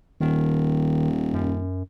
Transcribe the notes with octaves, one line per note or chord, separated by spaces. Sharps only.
D#1 D#3
F#2